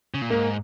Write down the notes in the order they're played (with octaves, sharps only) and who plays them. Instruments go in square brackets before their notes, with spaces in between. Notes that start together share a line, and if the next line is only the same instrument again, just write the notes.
[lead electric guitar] C#3
A#2
[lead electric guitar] G#2 [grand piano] A#3